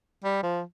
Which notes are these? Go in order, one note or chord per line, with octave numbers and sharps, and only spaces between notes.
G3
F3